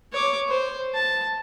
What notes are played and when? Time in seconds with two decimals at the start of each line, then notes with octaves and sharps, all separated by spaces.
0.12 C#5 D6
0.48 C5
0.95 A5